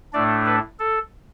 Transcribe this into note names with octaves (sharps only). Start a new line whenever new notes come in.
A2 A3 D4 D5
B4
A4